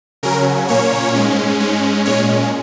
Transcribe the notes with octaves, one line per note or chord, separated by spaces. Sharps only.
C#3 F#3 C#4 A#4
A#2 A#3 C#4 C#5
G#2 G#3 C#4
G#2 G#3 C#4
A#2 G#3 C#4 C#5